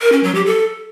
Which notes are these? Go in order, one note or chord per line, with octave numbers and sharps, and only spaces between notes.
A#4
C#4
F#3
G4
A4